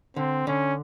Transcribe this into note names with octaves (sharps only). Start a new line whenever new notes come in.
D3 C4
D3 C#4